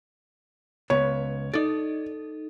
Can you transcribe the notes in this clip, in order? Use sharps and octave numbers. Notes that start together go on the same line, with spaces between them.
C#2 B3 C#5
D#4 A4 D5